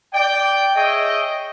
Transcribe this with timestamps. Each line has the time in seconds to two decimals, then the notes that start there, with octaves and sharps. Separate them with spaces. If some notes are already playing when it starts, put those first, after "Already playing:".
0.14 D5 G5
0.75 G#4 C#5 D#5 E5 G5